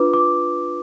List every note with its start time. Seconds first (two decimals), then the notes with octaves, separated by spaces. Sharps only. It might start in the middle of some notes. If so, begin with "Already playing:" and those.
Already playing: D4 F4 B4 D6
0.14 D6